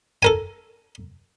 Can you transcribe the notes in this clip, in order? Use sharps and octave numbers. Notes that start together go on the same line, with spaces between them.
A4 A#4 G#5